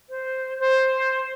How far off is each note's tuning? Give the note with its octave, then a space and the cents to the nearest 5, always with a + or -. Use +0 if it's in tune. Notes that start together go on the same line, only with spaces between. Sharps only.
C5 -5
C5 +10